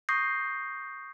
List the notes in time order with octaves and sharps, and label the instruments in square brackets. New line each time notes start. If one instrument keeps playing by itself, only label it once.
[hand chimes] C#6 D#6 G6 A#6 C7